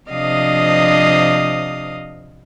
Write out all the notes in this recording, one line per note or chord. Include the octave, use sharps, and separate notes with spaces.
C3 F3 D4 D#5 F5 D#6